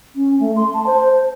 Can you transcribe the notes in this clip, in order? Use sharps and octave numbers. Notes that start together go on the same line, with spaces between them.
C#4
A3
C6
A5
C5